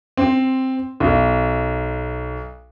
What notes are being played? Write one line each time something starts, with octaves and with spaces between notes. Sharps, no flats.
C4
B1